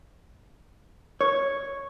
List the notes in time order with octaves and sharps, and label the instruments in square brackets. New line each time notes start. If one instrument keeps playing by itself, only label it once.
[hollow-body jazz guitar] C#5